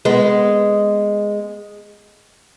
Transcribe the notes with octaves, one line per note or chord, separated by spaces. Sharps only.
G#3 B3